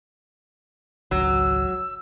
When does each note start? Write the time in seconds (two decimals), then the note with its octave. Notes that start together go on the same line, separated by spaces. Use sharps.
1.11 G#1 C#2 F#3 E6